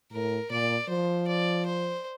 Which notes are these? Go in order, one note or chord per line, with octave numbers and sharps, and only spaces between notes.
A2 A#4
A#2 D5
F3 C5
D5
C5